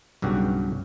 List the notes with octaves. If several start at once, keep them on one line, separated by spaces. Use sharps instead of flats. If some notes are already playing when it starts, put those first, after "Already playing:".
B1 G2 C#3 F#4 G4 G5